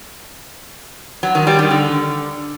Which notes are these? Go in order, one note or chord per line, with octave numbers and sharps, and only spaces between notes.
F#3
D#3
G3
D#3
D3